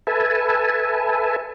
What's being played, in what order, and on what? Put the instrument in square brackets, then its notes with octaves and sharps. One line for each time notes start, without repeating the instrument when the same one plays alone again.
[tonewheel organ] A4 B4 E5 G#5 A5